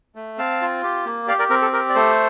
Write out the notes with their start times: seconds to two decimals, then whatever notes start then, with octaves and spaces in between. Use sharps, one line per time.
0.15 A3
0.38 C4 F5 A5
0.62 F4
0.83 G4
1.05 A#3
1.28 G4 D5 F5
1.39 A#4 D5
1.50 C4 A#4
1.62 A4
1.73 G4 A#4
1.89 D5
1.95 A3 A4 C5